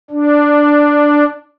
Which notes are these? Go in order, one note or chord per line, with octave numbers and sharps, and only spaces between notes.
D4